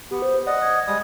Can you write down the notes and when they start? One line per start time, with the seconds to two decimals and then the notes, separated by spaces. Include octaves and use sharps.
0.11 B3 G4
0.22 C5
0.46 D5 D#5 F#5
0.62 G#6
0.87 G3 G#3 D#6